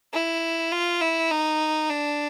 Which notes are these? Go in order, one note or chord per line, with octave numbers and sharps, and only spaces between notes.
E4
F4
E4
D#4
D4